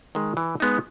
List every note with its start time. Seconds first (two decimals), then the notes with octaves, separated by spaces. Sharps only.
0.15 D#3 G#3
0.37 E3
0.60 G#3 B3 D#4